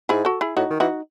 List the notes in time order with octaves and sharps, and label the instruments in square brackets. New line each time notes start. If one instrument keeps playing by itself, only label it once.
[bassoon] G#2 [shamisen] E4 G#4
[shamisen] F#4 A4
E4 G#4
[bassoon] A2 [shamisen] D#4 F#4
[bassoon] D#3
[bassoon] E3 [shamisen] D#4 F#4